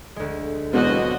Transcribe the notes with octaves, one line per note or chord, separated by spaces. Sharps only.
D2 G#3
E1 B2 D3 F#3 C4 F4 F#4 D#5